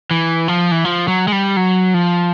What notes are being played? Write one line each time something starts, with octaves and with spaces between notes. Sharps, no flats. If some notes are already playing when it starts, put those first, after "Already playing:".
E3
F3
E3
F3
F#3
G#3
G3
F#3
F3